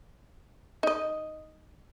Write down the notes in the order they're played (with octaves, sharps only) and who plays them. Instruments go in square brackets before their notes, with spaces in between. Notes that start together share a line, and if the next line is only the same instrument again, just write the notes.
[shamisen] D#4 D#5